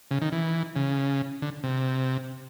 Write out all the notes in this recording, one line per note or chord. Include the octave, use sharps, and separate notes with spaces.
C#3
D#3
E3
C#3
D3
C3